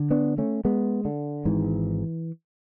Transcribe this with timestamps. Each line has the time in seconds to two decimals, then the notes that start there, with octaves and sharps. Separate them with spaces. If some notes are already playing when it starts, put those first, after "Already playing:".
Already playing: D3
0.11 B3 D4
0.38 A3 C#4
0.65 G#3 B3
1.05 D3
1.45 G#1 G#2 E3